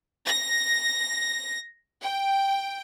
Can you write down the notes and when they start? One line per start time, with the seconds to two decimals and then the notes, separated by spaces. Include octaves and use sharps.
0.26 A#6
2.02 G5